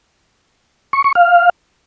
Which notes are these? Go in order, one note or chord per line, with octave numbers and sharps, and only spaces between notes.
C#6
C#6
F5